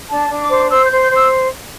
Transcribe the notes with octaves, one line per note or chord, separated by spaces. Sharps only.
D4 A5
D4
D6
C5
C5 E6
G6
C5
G6
C5 E6